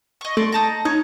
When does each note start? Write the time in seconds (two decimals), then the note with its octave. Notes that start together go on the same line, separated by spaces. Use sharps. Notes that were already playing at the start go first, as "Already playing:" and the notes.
0.21 D#5 C#6
0.37 A3 D5 C6 C#6
0.52 D#4 A5 A#5
0.85 D#4 C#5